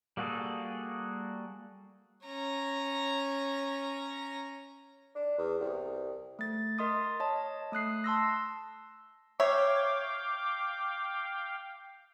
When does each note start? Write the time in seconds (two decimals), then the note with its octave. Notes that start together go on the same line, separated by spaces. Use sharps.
0.17 G3 A#3 F#4 G#4 A4
2.25 C#4 A#5
5.15 D4
5.38 E2
5.61 C2
6.39 A3 A6
6.78 A#4 D#5 C6 D#6 A6
7.20 C#5 D#5 A5
7.72 A3 D#6 F#6 C7
8.04 A5 C6 E6 A#6
9.40 C#5 E5 F5 G5 D6